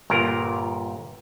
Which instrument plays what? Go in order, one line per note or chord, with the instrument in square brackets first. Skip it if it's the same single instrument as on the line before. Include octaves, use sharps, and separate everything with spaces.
[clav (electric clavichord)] G1 A#2 A#4 A#5